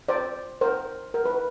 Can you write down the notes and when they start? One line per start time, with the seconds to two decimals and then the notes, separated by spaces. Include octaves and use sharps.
0.08 C5 D5
0.61 A#4 C5
1.14 A#4
1.25 B4